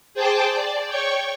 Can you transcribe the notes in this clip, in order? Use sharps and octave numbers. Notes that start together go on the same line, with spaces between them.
G#4 C5 G5 A5 D6
D5
C#5 G5 C#6